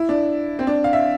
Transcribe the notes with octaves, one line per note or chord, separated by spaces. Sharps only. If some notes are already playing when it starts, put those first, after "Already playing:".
Already playing: E4
D4
C4
D4
F5
E5